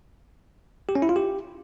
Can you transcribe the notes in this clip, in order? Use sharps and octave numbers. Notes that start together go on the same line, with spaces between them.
G4
C#4
E4
F4
G4